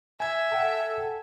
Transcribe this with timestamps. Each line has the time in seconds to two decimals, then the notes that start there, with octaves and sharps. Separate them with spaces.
0.20 E5 G#5 G#6
0.52 A4 F#5 G5 A5